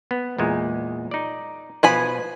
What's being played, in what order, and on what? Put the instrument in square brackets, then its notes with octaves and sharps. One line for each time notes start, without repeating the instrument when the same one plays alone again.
[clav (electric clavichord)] B3
E2 A#2 G#3
D#4 D5
[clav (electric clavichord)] B2 B4 [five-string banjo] F3 G#5 B5